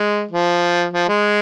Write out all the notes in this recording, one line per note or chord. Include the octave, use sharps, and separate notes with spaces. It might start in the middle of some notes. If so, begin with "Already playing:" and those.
Already playing: G#3
F3
F3
G#3